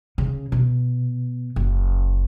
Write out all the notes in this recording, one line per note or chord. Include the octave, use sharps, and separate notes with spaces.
C#3
B2
F#1